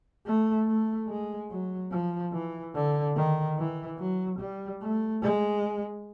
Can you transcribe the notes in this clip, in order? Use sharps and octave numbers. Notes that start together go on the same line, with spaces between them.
A3
A3
G#3
F#3
F3
E3
D3
D#3
E3
F#3
G3
A3
G#3